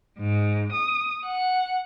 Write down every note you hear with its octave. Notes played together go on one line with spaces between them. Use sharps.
G#2
D#6
F#5